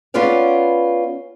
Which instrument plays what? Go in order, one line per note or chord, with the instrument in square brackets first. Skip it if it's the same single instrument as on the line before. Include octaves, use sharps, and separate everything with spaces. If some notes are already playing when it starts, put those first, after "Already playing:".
[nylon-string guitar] B3 C#4 F4 B4 D5 F5